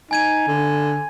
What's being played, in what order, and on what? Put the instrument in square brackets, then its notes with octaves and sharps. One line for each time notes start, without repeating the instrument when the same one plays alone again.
[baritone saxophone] D#4 [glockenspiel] G#5 G#6 D#7
[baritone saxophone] D3